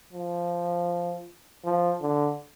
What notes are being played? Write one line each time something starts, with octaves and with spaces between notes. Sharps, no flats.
F3
F3
D3